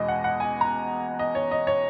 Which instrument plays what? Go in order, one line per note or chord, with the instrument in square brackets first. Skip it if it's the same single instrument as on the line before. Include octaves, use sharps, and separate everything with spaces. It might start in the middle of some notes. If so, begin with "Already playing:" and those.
Already playing: [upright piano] E2 B2 G#3 D#5
F#5
F#5
G#5
A#5
D#5
C#5
D#5
C#5